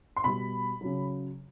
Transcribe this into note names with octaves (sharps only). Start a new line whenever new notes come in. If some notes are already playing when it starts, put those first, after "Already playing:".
C6
B2 G3 B5
C#3 F#3